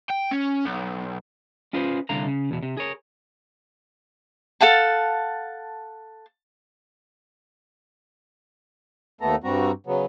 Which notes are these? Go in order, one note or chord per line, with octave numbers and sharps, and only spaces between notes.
G5
C#4
B1
C#4 F4 G#4 B4 C5
C2 D3 F5 A#5
C#3
E2 B2
C3
G#4 A#4 C#5
A4 F5 F#5 A5
D#2 A3 B3 A4 A#5
G2 G3 C4 F#4 A#5
C#3 F#3 B3